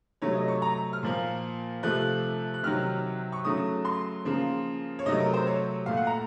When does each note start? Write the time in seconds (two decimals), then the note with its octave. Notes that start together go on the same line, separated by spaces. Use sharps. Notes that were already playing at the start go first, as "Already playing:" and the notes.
0.22 C3 F#3 A3 C#5
0.35 D#5
0.48 C#6
0.62 A#5
0.93 F6
1.03 A#2 F3 A#3
1.83 C3 F3 A3 F#6
2.54 F#6
2.63 C3 D#3 F#3 F6
3.32 C#6
3.45 C#3 F#3 A3 D#6
3.85 C6
4.25 C#3 F3 A#3
4.99 C#5
5.06 C3 F#3 A3 D#5
5.20 A#4
5.33 C5
5.47 C#5
5.86 A#2 A3 F5
5.97 F#5
6.07 A#5